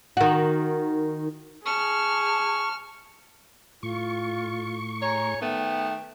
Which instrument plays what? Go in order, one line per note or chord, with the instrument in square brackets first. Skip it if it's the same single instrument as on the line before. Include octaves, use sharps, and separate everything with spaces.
[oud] D#3 F#4
[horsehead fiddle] G#4 [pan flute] A5 [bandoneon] C#6 [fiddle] F6
[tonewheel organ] A2 C#6 [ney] F4
[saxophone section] G#4 C#5 [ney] A#5
[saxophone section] D#3 A3 B3 [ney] G5